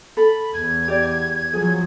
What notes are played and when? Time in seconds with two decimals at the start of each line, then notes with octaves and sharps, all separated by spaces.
0.17 A4 B5
0.54 E2 G#6
0.88 G4 D5
1.53 F3 F#3 G#4